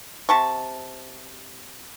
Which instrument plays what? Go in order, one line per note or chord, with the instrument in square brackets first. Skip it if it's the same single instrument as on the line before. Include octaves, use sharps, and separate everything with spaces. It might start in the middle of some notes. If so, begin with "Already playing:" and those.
[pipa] C3 A5 C#6